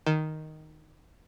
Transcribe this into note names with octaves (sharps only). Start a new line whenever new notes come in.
D#3